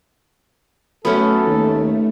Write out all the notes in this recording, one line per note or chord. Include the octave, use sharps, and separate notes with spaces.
F#3 A3 B3 C#4 A4
D#2